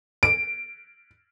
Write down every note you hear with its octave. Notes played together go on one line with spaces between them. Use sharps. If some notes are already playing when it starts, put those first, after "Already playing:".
D7